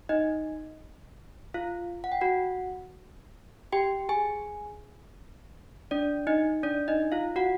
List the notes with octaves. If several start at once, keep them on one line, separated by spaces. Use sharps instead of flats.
D#4 D#5
F4 F5
F#5
G5
F#4 F#5
G4 G5
G#4 G#5
D4 D5
D#4 D#5
D4 D5
D#4 D#5
F4 F5
F#4 F#5